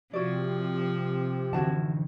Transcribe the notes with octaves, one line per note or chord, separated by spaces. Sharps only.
C3 F3 E4 F#4 D5
D3 E3 E4 F#4 A5